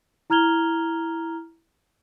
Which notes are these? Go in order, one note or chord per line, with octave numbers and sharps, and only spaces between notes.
E4 A#5 F6 G#6 F7 G7